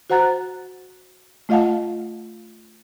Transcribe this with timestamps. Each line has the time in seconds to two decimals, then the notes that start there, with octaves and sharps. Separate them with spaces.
0.10 F#4 C5 F#5 A#5 F#6 A6
1.49 A3 F4 D#5 F5 F#5 A5